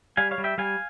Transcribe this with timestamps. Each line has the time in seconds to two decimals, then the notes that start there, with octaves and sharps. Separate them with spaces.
0.17 G3 F5 G#5
0.31 C#5 F5
0.38 G3
0.44 E5 G5
0.58 G3 F5 G#5